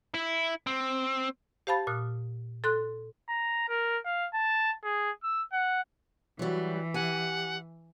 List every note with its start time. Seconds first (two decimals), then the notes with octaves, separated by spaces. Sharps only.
0.14 E4
0.67 C4
1.67 G4 C5 F5 A5 B5 A6
1.87 A#2 D#6 F6 F#6
2.64 A4 C6 F#6
3.29 A#5
3.69 A#4
4.05 F5
4.34 A5
4.84 G#4
5.23 E6
5.52 F#5
6.39 E3 F#3 G3 F#4
6.94 G4 F#5 G#5